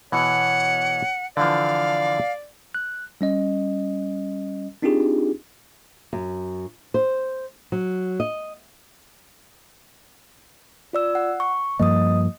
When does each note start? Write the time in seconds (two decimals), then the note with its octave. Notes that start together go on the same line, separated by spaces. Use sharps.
0.12 B2 E3 C#5 F#5
1.37 D3 E3 F3 D5 F5
2.75 F#6
3.21 G3 C#4 D#5
4.82 C4 D4 D#4 F4 G4 G#4
6.13 F#2
6.94 C5
7.72 F#3
8.20 D#5
10.93 F4 D5 E6
11.15 F#5
11.40 C#6
11.79 G2 F3 A#3 D#5 D#6